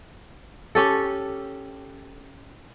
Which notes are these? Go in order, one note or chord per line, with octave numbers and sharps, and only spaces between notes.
C#4 G4 A4